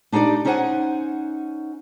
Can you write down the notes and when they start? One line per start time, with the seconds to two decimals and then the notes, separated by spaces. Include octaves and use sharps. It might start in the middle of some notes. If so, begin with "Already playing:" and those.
0.12 D4 D#4 G4 C#5 D5
0.45 C#4 D#4 E4 C5 F#5 G#5